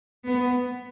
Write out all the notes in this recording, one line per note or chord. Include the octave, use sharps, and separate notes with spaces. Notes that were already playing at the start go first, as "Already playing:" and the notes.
B3